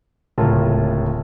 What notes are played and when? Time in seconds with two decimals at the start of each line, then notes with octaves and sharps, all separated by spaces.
0.38 D1 C#2 A2 F4 A#4 A5